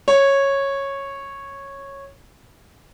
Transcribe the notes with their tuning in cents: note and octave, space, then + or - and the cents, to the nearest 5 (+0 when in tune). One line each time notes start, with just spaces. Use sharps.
C#5 -10